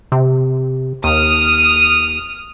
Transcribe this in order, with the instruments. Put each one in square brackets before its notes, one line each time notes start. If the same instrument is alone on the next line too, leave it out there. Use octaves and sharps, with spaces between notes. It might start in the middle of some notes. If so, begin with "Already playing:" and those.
[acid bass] C3
[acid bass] D#2 [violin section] D#6 F6